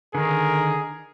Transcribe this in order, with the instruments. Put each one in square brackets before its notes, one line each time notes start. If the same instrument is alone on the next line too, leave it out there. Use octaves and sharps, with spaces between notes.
[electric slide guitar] D3 D#3 [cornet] G#4 [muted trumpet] A#4